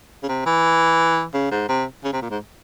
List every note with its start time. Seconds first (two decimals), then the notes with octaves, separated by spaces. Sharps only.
0.23 C#3
0.28 C3
0.46 E3
1.34 C#3
1.51 G#2
1.69 C3
2.04 C#3
2.13 C3
2.22 A#2
2.30 G#2